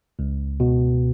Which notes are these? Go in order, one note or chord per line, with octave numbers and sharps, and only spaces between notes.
C#2
B2